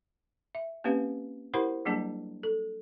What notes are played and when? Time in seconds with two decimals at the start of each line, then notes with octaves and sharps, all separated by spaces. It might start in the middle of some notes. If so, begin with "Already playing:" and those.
0.55 E5
0.84 A#3 C4 C#4 G4 B4 F5
1.54 E4 G4 A#4 C5 F#5 B5
1.85 F#3 G3 A#3 D4 G#4 A5
2.43 A4